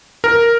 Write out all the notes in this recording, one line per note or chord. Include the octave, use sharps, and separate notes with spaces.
A#4